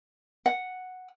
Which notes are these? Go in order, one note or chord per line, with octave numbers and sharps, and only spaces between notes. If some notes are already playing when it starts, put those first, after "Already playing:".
F#5